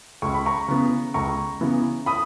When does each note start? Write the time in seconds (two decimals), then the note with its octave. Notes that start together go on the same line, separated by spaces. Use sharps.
0.22 C#2 C#6
0.34 B5
0.46 A#5 C#6
0.68 C#3 E3 B3
1.14 C#2 A#5 C#6
1.61 C#3 E3 B3
2.06 B5 D#6